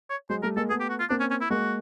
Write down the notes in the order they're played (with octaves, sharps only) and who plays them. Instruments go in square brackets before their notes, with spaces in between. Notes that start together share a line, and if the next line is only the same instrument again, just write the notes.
[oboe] C#5
[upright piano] F#3 G#3 [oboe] C5
[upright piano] G3 A3 [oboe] A#4
[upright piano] G#3 A#3 [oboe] A4
[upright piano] A3 B3 [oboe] G#4
[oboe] G4
F#4
F4
[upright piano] A#3 C4 [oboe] D4
[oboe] C#4
C#4
E4
[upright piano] G#3 A#3 [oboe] F#4